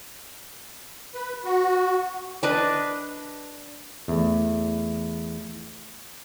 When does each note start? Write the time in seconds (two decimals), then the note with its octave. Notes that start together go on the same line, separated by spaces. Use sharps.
1.15 B4
1.44 F#4
2.43 D4 B4 D#5
4.08 E2 A3